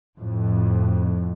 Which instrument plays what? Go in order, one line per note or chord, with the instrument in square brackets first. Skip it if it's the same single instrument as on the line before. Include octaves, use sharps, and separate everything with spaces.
[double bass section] F2 A2